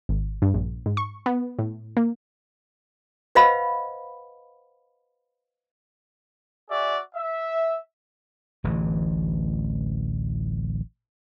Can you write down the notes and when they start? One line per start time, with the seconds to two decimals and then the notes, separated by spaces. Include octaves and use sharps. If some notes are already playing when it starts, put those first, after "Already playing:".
0.09 G#1
0.42 G2
0.54 A#1
0.86 G#2
0.97 C#6
1.26 B3
1.59 A2
1.97 A#3
3.35 B4 C5 D#5 F5 F#5 B5
6.69 F#4 G#4 D5 E5
7.14 E5
8.64 D1 A1 E3